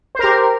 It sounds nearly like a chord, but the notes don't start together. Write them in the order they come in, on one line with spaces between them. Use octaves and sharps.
C5 A#4 G4